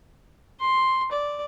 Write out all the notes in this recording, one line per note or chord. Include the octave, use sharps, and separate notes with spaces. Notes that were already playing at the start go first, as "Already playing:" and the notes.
C6
D5